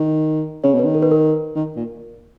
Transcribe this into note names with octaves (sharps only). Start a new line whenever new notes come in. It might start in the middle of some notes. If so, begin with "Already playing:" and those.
Already playing: D#3
C#3 C#5
B2
B4
D#3
A#4
B4
A#4
D#3
A#2